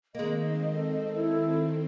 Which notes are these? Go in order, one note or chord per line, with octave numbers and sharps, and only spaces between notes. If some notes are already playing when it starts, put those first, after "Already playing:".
D#3 G#3 A#3 C4 D#5
A4
E4